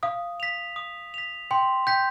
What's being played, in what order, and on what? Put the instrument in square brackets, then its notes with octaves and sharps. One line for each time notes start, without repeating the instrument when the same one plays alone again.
[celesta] F5 [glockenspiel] D#6
[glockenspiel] B6 F7
D#6
B6 F7
[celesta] G5 [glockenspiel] C6
[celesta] G5 [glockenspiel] G6 B6